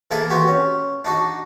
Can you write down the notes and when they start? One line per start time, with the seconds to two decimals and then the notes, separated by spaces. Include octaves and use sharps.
0.11 E3 A#3 B3 G#4 A4 E5
0.30 B3 C4 F#4 G4
0.48 C#4
1.05 D4 D#4 F#4